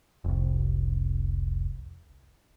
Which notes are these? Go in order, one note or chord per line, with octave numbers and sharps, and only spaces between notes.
F1 C2